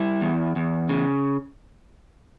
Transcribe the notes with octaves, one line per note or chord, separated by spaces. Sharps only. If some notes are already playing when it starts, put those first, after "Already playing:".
Already playing: G3 E4
E2
E2
C#3